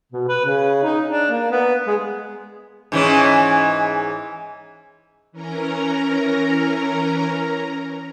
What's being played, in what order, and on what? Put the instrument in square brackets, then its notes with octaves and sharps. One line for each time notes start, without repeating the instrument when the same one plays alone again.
[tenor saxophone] B2
B4
C#3
D#4
D4
A#3
B3
G#3
[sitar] G#2 E3 C#4
[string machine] E3 C#4 A#4 A#5